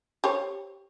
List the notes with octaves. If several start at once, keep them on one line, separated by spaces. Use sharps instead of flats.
G4 C5 C#5